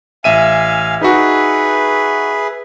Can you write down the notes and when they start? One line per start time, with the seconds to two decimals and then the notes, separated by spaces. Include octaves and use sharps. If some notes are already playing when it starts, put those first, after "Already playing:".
0.24 A1 E5 F5 G#5 D#7
1.01 D#4 F#4 G#4 B4 E5